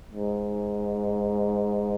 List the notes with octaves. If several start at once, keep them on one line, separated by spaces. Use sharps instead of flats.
G#2